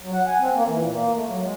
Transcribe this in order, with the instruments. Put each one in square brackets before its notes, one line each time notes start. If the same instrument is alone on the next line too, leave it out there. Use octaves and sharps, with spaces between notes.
[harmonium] F#3
F#5
G#5
C4
A#3
E3
A#2
A#3
A3
F#3
G#3